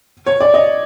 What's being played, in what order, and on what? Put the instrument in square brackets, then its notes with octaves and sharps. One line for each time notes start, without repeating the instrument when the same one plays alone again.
[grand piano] C#5
D5
D#5